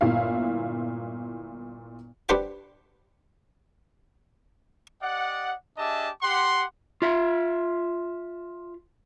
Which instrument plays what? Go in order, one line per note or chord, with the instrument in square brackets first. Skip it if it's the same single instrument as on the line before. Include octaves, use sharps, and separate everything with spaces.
[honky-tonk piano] G1 A#2 E4 F5
[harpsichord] D4 G4 B4 C5 F#5 G5
[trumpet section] G4 D5 D#5 F#5
D4 G4 G#4 D#5 E5 A5
G4 F#5 C6
[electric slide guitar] F4 E5